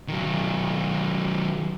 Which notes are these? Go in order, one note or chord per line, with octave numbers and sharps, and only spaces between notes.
D#3 F#3